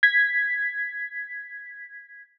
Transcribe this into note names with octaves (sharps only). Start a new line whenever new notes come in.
G#6 B6